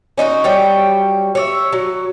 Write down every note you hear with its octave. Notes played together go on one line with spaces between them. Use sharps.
C#4 D#4 E4 F#4
F#3 G3 C#5 G5
C#5 D5 E5
F#3